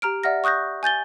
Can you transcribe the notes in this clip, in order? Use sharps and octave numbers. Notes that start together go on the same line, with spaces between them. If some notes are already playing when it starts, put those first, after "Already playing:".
G4 A#5 F6 D7
D5 E5 F#5 F6 A#6
C#6 D#6 F#6 G6 A#6
G#5 G6 A6 G7